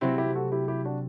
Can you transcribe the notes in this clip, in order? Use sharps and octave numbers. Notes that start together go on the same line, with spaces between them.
C3 F#3 A3 C4 E4
E4 G4
F#4 A4
E4 G4
E4 G4
D4 F#4